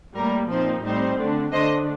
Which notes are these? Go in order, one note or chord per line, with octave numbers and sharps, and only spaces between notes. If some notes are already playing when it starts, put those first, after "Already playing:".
A2 G3 A#3 A#4
A#2 F3 C4 D#4 C5
A2 G3 C4 D#4 C5
D3 A3 D4
D3 A3 D4 C5 D#5